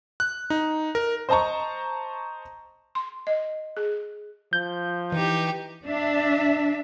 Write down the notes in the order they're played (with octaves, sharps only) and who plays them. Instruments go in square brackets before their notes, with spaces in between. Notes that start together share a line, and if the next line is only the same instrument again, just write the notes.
[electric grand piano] F#6
D#4
A#4
[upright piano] C5 D#5 A5 A#5 C#6
[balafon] C6
D#5
G#4
[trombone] F3 [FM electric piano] G6
[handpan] E3 [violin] D#4 G4
[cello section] D4 E5